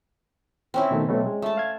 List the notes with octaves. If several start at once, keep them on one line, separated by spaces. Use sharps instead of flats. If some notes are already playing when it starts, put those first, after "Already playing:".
C4 C#4 E4
B2 D#3 A3
B2 F#3 A3
G#3
A3 A5
F5 G#6